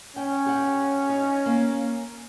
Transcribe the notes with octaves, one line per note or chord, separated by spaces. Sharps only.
C#4 G5
G4 F#5
D#4
A#3